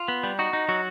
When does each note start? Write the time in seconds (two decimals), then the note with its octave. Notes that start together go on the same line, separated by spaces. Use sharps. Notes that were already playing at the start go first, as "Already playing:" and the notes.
Already playing: F4
0.08 B3
0.23 G3
0.39 D#4 F#4
0.53 D#4
0.69 F#3 F#4